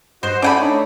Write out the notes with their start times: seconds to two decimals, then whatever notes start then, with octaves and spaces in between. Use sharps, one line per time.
0.23 G2 F#4 C5 D#5
0.42 C#4 E4 A4 D5 G5 G#5 B5
0.60 A3 D4 D#4 C#5